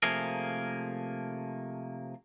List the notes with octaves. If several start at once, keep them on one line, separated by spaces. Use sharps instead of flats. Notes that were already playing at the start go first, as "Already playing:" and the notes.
C3 F3 A3 A#3 G#4 A#4